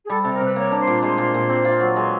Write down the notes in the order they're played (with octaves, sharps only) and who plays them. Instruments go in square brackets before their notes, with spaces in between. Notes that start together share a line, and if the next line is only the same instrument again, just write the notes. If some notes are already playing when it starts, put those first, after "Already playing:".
[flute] G#4
[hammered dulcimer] G3 [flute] A4
[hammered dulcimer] C3 [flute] A4
[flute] A#4
[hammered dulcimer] C3 [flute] B4
[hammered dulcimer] A#3 [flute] C#5
[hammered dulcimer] D4
[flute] C5
[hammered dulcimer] A#2
[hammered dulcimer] G#3 [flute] C5
[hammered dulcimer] A#2
A#2
C4
F4
F#3
[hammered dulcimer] G#3 [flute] B4